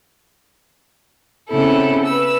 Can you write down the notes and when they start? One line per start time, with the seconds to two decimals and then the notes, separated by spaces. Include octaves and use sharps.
1.49 C#3 B3 C4 E4 A4
2.04 B4 E6